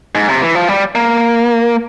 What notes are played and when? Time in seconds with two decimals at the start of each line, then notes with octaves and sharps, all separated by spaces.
0.15 G#2
0.28 C3
0.42 E3
0.55 F3
0.69 G3
0.95 A#3